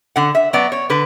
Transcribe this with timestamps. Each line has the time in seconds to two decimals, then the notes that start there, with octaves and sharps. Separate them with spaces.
0.16 D3 F#5
0.35 E5
0.53 F#3 B3 D5
0.72 C#5
0.90 D3 B4